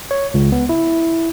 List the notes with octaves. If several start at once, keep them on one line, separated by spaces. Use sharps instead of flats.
C#5
C#2
B3
E4